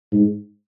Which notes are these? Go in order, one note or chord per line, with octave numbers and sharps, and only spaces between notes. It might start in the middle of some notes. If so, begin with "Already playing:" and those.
G#2